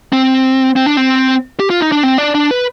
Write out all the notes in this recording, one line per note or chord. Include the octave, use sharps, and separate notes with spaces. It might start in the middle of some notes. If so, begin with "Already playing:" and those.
C4
C4
D4
C4
G4
F4
D#4
D4
C4
D4
D4
B4